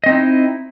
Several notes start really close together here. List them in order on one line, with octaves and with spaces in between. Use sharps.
D#5 C4 D#4 E4